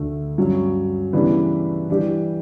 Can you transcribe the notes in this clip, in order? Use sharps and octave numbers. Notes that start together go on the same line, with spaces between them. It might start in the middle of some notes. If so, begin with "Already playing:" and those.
Already playing: D2 D3 A3
G2 F#3 C#4
C#3 E3 G3 B3 D4
E3 G3 D4 G4